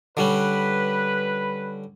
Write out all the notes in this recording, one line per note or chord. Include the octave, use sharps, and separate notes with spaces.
D3 G3 C#4 B4